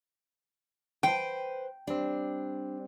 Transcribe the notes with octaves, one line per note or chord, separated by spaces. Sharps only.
B4 C5 G5
G3 C4 D4